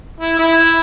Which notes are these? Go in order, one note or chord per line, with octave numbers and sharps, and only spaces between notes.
E4
E4